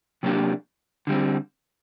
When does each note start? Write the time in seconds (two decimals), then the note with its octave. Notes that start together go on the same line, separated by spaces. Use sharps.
0.23 C3 F#3 A#3 D4 G4
1.07 D3 G3 C4